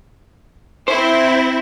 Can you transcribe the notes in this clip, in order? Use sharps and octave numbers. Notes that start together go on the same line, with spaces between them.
C4 E4 C5